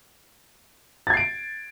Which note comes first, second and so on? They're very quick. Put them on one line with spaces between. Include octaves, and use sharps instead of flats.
A6 G#6 C7 D7